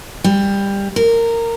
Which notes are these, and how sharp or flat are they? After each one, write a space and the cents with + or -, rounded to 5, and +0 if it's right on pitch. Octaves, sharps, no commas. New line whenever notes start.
G3 +20
A#4 -15